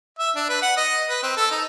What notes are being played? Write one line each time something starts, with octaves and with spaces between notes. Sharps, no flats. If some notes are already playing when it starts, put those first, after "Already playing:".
E5
D4
B4
F#5
D#5
B4
C4
A4
D#4